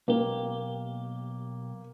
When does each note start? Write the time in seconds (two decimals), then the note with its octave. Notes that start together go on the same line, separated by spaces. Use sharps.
0.08 B1 A#3 G4